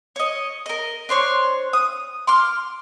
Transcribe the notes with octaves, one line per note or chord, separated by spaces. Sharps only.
C#5 D#5
A#4 D#5
D4 C5 C#5 C6
D#6
C6 D6 F6